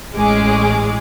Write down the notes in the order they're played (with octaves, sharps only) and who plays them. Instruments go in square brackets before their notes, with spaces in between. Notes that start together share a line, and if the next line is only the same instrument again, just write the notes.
[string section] A1 G#3 C#4 G#4 D6